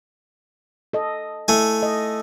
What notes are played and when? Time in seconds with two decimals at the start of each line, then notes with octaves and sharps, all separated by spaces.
0.93 A4 D#5
1.48 A3 E4 G#5
1.82 D#5